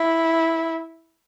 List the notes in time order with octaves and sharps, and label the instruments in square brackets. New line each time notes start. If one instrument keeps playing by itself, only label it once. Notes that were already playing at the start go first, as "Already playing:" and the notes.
Already playing: [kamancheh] E4